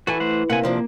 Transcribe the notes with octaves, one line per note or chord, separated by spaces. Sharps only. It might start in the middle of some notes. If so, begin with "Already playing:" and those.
E3 F#4 A4 G#5
A3 C5 F#5
C3 A#3 F#5 G#5
C3 F3 A#3 D4